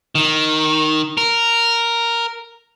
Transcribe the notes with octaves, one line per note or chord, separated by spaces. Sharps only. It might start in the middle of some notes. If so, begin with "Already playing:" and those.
D#3
A#4